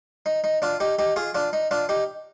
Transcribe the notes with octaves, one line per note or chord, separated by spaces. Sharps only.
D#4
D#4
D4 F4
D#4 G4
D#4 G4
F4 G#4
D4 F4
D#4
D4 F4
D#4 G4